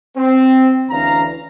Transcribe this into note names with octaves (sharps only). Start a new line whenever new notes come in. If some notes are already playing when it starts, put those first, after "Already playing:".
C4
D2 E3 C#4 D4 F5 A#5